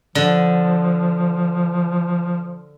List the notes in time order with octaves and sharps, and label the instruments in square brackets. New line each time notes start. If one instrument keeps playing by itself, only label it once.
[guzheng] D3 [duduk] F3